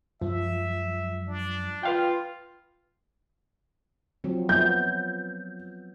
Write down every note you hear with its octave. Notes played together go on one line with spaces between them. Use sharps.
F#2 F3 G#3 E5
D4
F4 B4 F5 G5
F3 F#3 C4
F3 F#3 B3 G6